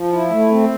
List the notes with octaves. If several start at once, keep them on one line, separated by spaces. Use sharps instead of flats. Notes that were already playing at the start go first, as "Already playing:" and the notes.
Already playing: F3
E4
A3
C4